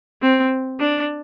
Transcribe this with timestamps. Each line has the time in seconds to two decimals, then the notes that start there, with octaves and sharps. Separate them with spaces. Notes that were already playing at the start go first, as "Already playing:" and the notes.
0.22 C4
0.80 D4